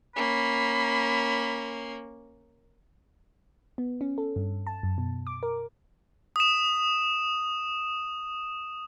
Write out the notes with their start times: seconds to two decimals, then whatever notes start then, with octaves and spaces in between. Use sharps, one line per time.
0.16 A#3 C#4 B5
3.78 B3
4.01 C#4
4.18 A4
4.36 G2
4.67 A5
4.83 F#2
4.98 B2
5.27 D6
5.43 A#4
6.36 D#6 E7